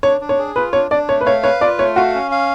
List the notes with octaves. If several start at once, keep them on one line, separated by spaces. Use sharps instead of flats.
D4 C#5
D4
C#5
G#4
F4 B4
D4 C#5
D4 D5
A3 C#5
B4
C#5 F5
B4 C#5
F4 D5
A3 C#5
F#4 F5
C#4
F5